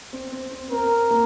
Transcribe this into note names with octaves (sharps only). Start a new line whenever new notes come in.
C4
C4
C4
C4 A#4
A#3